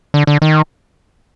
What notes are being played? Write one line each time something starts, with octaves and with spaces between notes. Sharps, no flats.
D3
D3
D#3